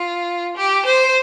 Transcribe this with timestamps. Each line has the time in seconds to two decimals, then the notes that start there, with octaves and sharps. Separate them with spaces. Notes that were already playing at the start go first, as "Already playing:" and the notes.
Already playing: F4
0.57 G4
0.86 C5